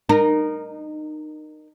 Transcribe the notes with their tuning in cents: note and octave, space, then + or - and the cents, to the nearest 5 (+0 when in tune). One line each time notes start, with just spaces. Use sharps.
D#4 -25 A#4 +0